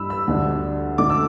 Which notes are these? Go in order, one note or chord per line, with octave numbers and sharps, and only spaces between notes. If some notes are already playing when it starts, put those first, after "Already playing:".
Already playing: G2 E3 G3 B5 E6
E6
D2 D3 G3 D4
D2 D3 A3 D4 D6
E6